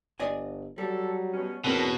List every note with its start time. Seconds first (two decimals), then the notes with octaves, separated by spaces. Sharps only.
0.20 G1 D5 D#5 G#5
0.78 F#3 G3 A4
1.33 B2 C#4
1.64 E2 B2 C4 C#4 A4 A#4